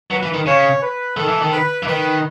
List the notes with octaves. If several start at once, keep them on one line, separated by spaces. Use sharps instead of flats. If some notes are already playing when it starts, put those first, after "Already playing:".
F#3 B4
E3
D#3
C#3 C#5
B4
D#3 A4
E3
D#3
B4
E3
D#3 B4